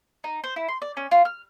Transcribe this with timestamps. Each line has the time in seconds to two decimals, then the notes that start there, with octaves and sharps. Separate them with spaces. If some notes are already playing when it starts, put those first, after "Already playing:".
0.24 D#4
0.44 C5
0.56 E4
0.68 C6
0.82 D5
0.97 C#4
1.11 F4
1.25 F6